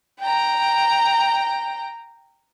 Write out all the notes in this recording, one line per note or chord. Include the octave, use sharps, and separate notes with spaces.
G5 A#5